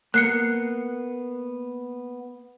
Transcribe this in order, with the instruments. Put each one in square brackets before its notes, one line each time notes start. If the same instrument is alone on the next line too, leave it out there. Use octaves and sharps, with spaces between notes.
[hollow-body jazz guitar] A#3 B3 [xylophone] F#6 C7 C#7